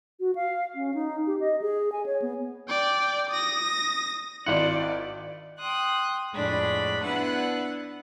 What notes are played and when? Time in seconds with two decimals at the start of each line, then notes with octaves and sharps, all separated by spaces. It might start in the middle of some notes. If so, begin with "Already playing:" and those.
0.20 F#4
0.35 F5
0.75 C#4
0.94 D#4
1.27 G4
1.40 D#5
1.62 G#4
1.92 G#5
2.06 C#5
2.22 B3
2.69 D5 G5
3.29 D#6 A#6
4.46 G#1 E4 F4 D5 F#5
5.59 G5 C6 D#6 F#6
6.33 F2 A2 G#3 D4 B5
7.04 B3 D4 E4 B4 F#5